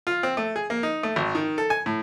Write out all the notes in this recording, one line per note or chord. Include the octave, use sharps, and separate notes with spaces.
F4
C4
A3
G#4
A#3
D#4
A3
G#1
D#3
A4
G#5
A2